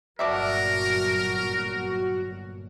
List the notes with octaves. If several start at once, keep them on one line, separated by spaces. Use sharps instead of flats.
G1 A#2 F#3 D4 F#4 A#4 D5 E5